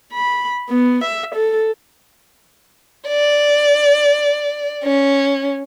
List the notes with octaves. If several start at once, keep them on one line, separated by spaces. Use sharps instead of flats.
B5
B3
E5
A4
D5
C#4